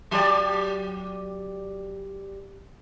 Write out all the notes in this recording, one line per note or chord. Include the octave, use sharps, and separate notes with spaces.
F#3 G4 D5